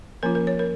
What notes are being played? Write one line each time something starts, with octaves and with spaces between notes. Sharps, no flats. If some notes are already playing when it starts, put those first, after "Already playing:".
F3 A#3 C#4 F4 A#4
A#4
C#5
A#4